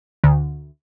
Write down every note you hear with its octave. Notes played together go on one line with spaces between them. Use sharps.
D2